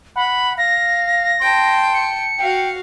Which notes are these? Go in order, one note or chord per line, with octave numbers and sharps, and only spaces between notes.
F#5 B5
F5 A#6
G5 A5 C6
C#7
F#4 F5 G5